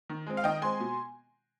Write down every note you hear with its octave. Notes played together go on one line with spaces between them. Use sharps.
D#3
G#3 C4
F5
D#3 D#5 G5
G#3 C4 G#5 C6
B2